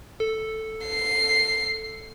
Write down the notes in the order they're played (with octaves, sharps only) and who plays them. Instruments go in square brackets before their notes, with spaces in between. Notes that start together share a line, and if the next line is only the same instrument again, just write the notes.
[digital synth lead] A4
[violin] C7